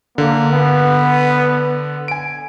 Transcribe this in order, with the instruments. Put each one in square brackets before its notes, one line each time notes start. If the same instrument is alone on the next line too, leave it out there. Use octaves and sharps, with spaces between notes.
[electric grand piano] D3 [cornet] A#3
[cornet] B3
[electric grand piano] G#5 D7